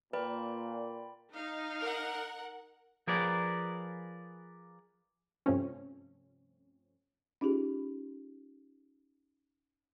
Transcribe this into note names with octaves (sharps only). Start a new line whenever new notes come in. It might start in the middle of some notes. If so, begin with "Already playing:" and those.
A#2 B4 D5 G5 B5
D#4 F5
A#4 F#5
F3 G#4 A#4 B4 D5
G2 C3 F3 A3 C4 C#4
C#4 D#4 F4 G4 G#4